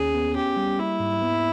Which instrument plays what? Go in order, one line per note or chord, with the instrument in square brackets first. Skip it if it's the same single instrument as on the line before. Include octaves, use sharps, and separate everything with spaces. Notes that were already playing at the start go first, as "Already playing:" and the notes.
Already playing: [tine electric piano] D#2 C#4 [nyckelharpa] G#4
[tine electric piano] B3
[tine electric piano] C#4 [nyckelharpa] G4
[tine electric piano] G3
[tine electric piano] A#3 [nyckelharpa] E4
[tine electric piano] G#2
B3